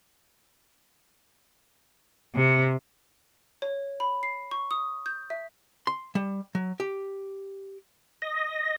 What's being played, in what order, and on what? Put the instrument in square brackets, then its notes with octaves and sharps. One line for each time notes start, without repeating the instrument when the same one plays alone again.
[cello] C3
[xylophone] C#5
B5
C7
C#6
D#6
G6
E5
[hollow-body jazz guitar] C6
G3
F#3
G4
[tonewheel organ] D#5